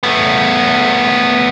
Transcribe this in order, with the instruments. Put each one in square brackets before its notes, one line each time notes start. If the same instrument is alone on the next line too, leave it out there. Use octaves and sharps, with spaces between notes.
[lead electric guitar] A3 B3